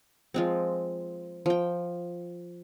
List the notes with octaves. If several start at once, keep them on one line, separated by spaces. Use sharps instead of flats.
F3 G#3 C4
F3 G5